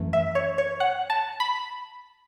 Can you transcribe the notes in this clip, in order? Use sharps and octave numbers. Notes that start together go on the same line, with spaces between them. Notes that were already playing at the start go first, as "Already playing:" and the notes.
Already playing: F#2 E3 A3
E5
C#5
C#5
F#5
A5
B5